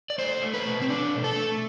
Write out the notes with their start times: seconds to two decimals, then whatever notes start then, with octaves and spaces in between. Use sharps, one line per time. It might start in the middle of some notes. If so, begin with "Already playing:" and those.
0.10 D5
0.18 A3 C5
0.42 A3
0.54 B4
0.66 B2
0.82 C4
0.89 B2 D4
1.12 A3
1.24 A4
1.35 A3